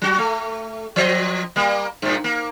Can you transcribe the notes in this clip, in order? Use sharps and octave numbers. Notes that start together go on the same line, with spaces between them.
F#3 F#4
A3
F3 C5 D#5
G3 A#3
G2 A#2
A#3